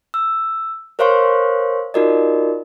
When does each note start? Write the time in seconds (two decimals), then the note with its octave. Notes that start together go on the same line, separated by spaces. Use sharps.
0.14 E6
0.99 A#4 C5 C#5 F5 C6 C#6
1.94 D#4 F4 F#4 A#4 D5 D#5